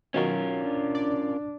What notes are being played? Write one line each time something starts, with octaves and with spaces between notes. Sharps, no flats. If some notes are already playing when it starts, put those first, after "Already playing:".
B2 D#3 F#3 C#4 F4 A#4
D4
D5